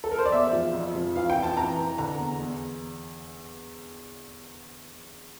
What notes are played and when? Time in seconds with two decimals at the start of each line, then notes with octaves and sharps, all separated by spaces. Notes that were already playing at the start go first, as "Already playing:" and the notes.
0.04 A4
0.11 A#4
0.18 C5
0.25 D5
0.32 E2 E5
0.53 F3
0.74 F2
0.95 F3
1.16 E3 F5
1.30 G5
1.37 F2
1.43 A5
1.57 E3 A#5
1.78 E3
1.98 D3 A#5
2.19 E2
2.40 E2